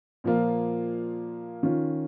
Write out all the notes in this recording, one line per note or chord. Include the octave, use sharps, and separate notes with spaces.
A#2 F3 A#3 F4
D#3 C#4 F4